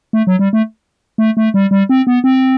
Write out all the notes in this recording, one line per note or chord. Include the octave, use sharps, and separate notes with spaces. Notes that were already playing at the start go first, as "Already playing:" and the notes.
A3
F#3
G3
A3
A3
A3
G3
G3
C4
B3
C4